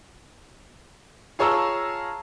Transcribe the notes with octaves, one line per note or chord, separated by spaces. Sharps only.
F4 G#4 C#5 A5 A#5 E6